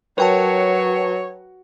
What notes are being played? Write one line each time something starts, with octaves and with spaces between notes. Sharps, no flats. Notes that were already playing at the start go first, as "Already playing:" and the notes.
F#3 A#4 B4 C#5 G5 A5